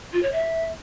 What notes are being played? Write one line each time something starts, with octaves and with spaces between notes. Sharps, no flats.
F4
C#5
E5